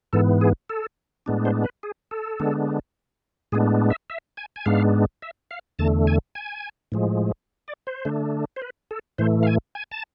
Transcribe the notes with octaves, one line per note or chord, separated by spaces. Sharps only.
G#2 E3 B3 A4
G#4
A4
A2 G#3 B3 D4
C5
B4
G#4
A4
D3 G#3 B3 D4
A2 G#3 B3 D4 G#4
E5
E5
G#5
G#5
G#2 G#3 B3 D4 F5
E5
F5
E2 D3 A3 A5
G#5
G#5
A2 F3 G#3
D5
C5
D3 A3 D4
C5
B4
A4
A2 E3 A3 C5
F5
G#5
G#5
A5